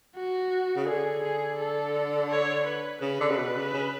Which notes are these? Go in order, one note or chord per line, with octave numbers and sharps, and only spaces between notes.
F#4
C#3
D3 G#4
G#4
A4
C#5
B4
C#3 B4
D3
C#3
B2
C#3
C#3